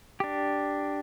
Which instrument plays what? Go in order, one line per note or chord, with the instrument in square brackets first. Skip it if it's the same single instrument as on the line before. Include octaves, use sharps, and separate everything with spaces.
[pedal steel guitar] D4 G4